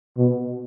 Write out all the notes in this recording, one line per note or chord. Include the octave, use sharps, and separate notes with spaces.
B2